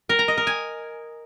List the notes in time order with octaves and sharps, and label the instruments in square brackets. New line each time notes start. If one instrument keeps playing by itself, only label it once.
[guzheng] A#4
A#5
D#5
A#4
G#5